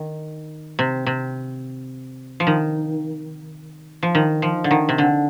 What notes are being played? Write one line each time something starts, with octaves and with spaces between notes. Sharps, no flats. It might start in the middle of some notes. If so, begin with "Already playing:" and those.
Already playing: D#3
C3
C3
F3
D#3
F3
D#3
F3
D3
D#3
C3
D3